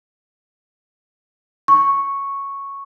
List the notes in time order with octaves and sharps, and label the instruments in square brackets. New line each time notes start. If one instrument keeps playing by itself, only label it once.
[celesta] C#6